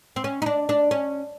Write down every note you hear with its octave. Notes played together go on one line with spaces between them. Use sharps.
C4
C#4
D#4
D4
D4
C#4